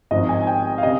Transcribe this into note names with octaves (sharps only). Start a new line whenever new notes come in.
G#1 G#2 F3 D#5
G#5
G5
F5
C3 D#5